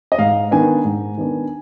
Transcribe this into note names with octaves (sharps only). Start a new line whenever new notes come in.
D#5
G#2 F5
D#3 B3 D4 G#5
G#2
D#3 B3 D4